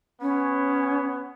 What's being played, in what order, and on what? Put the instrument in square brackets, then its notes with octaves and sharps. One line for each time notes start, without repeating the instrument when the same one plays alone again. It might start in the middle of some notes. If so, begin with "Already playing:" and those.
[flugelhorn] B3 [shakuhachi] C#4